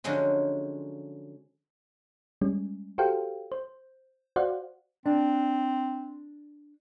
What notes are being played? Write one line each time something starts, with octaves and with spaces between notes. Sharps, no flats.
D3 F3 F#3 G#3 C#4 F4
G3 G#3 C#4
F#4 G4 A4 C5 F5 G5
C5
F#4 C5 D5 F5 F#5
C4 D4